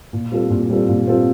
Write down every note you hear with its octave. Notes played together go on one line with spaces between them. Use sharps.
A#2
G3 C4 F4 A4
A#2
G3 C4 F4 A4
A#2
G3 C4 F4 A4